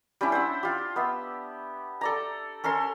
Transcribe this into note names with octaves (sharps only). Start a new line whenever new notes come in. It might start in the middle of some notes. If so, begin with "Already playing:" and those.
G3 C#4 D4 E4
C5 F#5 E6
F4 G4
B3 E5
A4 D5 A#5
C#4 A4 A#4 C6